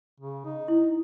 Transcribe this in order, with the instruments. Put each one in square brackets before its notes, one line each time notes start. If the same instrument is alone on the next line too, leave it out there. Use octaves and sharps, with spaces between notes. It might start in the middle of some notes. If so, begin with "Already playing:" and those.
[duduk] C#3
D#4
[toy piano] E4